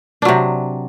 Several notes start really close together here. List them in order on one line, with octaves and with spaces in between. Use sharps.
D4 F#3 C3